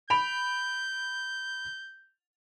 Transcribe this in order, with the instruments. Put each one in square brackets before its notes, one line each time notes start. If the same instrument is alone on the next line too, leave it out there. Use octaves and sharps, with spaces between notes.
[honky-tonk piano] B5 D7 F7 [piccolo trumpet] G6